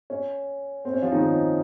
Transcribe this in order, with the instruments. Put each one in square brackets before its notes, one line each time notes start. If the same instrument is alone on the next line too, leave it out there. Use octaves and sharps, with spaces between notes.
[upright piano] C#4
C4
C#4
F3 F4
D#3 D#4
C#4